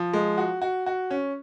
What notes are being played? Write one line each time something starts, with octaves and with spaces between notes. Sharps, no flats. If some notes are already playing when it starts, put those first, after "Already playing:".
Already playing: F3
G#3
F#4
F#4
F#4
C#4